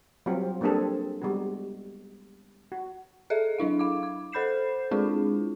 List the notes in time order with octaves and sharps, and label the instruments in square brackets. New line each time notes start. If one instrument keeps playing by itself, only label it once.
[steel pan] F#3 G3 C4 F4 G4
G3 A#3 C4 D4 G#4 A4
G3 G#3 B3 F#4
F#4
[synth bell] G#4 A4 D#5 E5
F#3 D4 E4 F5
F5 D6
D6
A4 C5 B5 G6 C7 E7
G#3 C4 D4 E4 F4 G#4